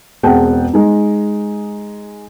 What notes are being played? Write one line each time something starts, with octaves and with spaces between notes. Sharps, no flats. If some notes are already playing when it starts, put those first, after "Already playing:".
E1 C4 G#4 F#5 G5 A5
G#3 D#4